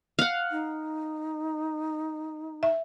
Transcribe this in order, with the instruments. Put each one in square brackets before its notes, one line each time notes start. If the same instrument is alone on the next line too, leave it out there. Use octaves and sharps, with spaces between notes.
[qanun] F5 F#5
[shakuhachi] D#4
[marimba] E5